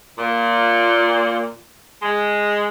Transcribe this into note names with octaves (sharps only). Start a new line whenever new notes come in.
A#2
G#3